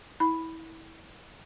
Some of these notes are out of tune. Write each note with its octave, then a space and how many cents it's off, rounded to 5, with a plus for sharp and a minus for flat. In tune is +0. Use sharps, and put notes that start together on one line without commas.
E4 -25 B5 +0